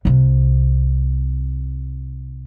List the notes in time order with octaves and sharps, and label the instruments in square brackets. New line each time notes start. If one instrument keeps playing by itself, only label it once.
[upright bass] C2 C3